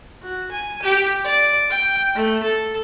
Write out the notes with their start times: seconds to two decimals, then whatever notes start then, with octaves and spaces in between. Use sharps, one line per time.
0.22 F#4
0.51 G#5
0.82 G4
1.24 D5
1.70 G5
2.15 A3
2.43 A4